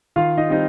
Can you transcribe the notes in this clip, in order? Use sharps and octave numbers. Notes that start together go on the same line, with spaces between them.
D#3 F4 F5
D#4 D#5
G3 C4 D#4